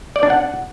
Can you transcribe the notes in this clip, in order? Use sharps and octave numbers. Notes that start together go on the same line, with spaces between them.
D5
D4
F#5